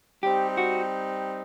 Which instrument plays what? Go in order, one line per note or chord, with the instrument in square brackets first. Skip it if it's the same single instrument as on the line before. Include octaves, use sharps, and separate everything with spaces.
[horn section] G3 C4 D#4 [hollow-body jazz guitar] G4
[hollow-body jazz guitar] F#4